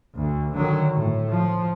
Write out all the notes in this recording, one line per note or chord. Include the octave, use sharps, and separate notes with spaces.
D2
D3 D#3 F#3
A2
F3